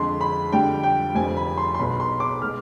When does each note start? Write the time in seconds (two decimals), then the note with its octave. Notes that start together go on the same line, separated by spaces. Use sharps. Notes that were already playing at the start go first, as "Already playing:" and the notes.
Already playing: F2 D3 G#3 C6
0.21 B5
0.52 F2 D3 G3 G5
0.83 G5
1.15 F1 F2 D3 G3 C4 G#5
1.37 B5
1.58 C6
1.74 C6
1.79 B1 B2 B3 B5
2.00 C6
2.20 D6
2.42 B2 G#3 F6